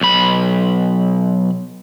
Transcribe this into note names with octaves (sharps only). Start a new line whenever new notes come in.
B1 B5